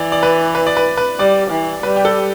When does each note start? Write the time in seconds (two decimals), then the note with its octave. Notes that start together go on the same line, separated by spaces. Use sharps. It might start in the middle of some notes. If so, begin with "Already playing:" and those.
Already playing: E3 D5
0.12 D5
0.23 B4
0.55 B4
0.67 D5
0.77 B4
0.97 B4
1.19 G3 D5
1.51 E3
1.83 G3 B4
1.96 G4
2.05 A4